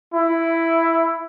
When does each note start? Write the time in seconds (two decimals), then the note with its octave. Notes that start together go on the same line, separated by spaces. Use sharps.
0.14 E4